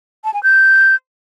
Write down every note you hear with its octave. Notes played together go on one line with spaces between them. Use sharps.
A5
G#5
G6